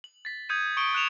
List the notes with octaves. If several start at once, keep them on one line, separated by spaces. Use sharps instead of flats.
F#7
A6 B6
D#6 G6 G#6 C#7 D#7
C#6 D#6 C#7 D7 G7
F#6 C#7 E7 F7